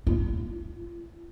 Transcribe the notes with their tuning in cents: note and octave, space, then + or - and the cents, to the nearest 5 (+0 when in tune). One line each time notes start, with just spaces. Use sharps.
F4 -45